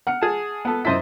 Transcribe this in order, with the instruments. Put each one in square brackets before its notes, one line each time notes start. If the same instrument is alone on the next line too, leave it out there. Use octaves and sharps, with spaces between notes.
[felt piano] F#5 F6 C#7
[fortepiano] G#4 A5
B3 A4
[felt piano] F#2 A6 B6 [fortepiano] E4 C5 D#5